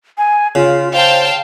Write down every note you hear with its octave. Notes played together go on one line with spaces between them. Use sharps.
G#5
C#3 F4
C5 F5 G5 A5